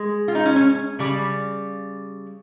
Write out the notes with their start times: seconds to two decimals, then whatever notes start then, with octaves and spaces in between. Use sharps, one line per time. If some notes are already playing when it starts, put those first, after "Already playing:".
Already playing: G#3
0.28 F4
0.35 D#4
0.45 C#4
0.56 C#4
0.99 C#3 G3